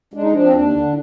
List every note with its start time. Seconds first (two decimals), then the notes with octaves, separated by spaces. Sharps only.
0.14 G#3 D4
0.22 D#4
0.32 F3 D4
0.44 C4
0.53 D#2 D4
0.73 D3